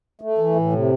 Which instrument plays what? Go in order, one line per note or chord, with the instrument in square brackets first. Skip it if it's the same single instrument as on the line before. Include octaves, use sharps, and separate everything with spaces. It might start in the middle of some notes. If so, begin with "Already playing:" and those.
[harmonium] A3
E3
A2
C3